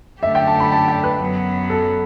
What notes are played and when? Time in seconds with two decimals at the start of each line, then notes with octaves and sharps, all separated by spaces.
0.23 F#2 D3 A3 D4 G4 E5
0.35 G5
0.47 A5
0.60 B5
0.72 A5
0.88 G5
1.04 B4
1.20 F#2 F#3 B3
1.70 A4